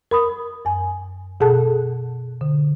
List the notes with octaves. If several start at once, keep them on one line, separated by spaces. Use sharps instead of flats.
A#4 B5 D#6
F#2 G#5
B2 G#4 A4 F#5 A5 F#6
D3